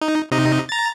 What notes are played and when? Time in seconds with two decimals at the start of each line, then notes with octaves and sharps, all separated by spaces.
0.01 D#4
0.31 C3 D#4 D#5
0.69 A#5 A6